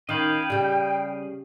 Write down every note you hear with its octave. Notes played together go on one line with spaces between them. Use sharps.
D#3 C#4 D#5 F5 G5 B5 G6 G#6
C#3 G3 C#4 G4